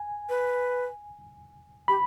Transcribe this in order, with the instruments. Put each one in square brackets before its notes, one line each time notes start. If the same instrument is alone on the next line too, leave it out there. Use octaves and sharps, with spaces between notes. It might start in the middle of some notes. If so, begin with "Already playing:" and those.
Already playing: [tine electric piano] G#5
[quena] B4
[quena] G4 [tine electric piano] B5